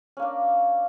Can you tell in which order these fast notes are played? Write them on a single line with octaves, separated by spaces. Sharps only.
C#4 A#3 D4